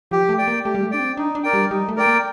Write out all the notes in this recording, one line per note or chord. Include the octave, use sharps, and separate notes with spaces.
F3 G4
A3
D5 G5
A#3
A3 G4
G3
A3
D4 D5 G5
C4
D4 D#4
D4
A#4 D5 G5
G3
G3 D#4
A3
A#4 D5 G5
A#3